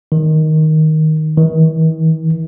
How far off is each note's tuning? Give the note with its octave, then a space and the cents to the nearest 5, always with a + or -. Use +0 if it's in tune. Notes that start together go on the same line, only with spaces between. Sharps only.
D#3 +5
D#3 +45